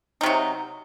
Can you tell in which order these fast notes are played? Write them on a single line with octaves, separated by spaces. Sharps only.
D#4 C3 F#3